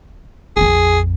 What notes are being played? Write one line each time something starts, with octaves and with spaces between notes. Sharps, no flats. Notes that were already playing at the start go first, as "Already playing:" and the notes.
A#1 F2 G#4